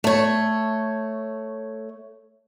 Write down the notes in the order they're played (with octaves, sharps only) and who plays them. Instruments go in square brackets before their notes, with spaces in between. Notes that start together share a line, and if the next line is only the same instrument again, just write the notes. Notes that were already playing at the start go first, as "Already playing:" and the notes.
[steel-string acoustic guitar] A3 C#5